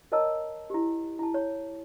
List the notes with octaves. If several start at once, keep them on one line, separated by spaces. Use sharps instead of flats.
A#4 C#5 D#5 A5 A#5 E6
E4 G4
E4 A5
C#5